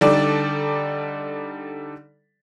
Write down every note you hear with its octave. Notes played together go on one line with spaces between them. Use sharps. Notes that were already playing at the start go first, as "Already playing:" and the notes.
D3 G3 D#4 A4 D5